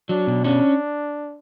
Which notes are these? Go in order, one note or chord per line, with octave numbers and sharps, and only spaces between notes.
F#3 D4
B2
C#4 D4